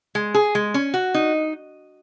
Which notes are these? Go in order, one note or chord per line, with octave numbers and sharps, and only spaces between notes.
G#3
G#4
G#3
C#4
F#4
D#4